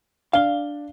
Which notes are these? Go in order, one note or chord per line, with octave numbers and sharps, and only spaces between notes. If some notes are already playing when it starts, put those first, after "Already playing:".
D4 D5 F5 G7